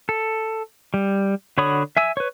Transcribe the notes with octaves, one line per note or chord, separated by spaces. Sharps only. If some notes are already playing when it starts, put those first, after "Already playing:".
A4
G3
D3 F#4 C#5 B5 D#6
E5 G#5 E6
B4 C#5